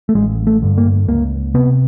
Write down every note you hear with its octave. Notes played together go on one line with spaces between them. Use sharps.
A3
A1 G#3
A3
G2 D3
A#3
C#2 A#3
C3 B3